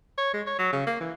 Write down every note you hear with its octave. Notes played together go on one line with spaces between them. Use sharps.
C#5
G#3
C#5
F#3
C#3
A#3
E3